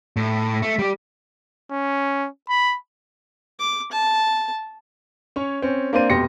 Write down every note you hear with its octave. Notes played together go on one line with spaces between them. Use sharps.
A2
A3
G3 G4
C#4
B5
D6
A5
C#4 C#5
C4 C#4
A#3 C4 D4 C5 D#7
F1 B2 G4 C6 A#6 C#7